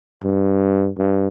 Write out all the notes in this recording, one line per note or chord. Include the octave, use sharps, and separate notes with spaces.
G2
G2